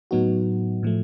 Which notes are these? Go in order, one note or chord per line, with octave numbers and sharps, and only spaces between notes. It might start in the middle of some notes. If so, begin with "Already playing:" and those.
A2 F#3 B3 D#4 F#4
A2 F3 A3